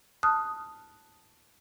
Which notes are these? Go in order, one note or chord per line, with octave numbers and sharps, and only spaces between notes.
A5 D#6 F6 F#6